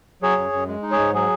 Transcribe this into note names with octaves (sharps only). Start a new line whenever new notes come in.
F#3 G#4 C#5
F#2
F#2
G#3
D#4
G#4 C#5
G#2
F#3 G#4